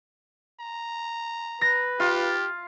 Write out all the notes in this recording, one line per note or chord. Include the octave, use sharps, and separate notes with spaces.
A#5
B4 A#6
F4 G4